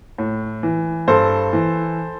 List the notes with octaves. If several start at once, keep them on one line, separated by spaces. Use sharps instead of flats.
A2
E3
G2 A4 C5
E3